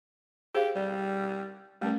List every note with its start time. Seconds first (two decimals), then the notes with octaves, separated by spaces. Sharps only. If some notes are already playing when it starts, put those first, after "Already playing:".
0.55 G4 G#4 C5 F5
0.76 G3 D5
1.81 G3 A3 C#4 A#4